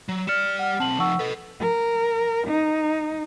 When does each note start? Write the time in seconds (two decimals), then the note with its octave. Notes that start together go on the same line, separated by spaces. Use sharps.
0.09 F#3
0.27 G3 D5 F6 C#7 E7
0.59 F#5 F6
0.80 B1 C4 A5 F#7
1.00 F3 D#4 F#5 C#6 E6
1.19 A4 B4 D#5
1.60 A#4
2.47 D#4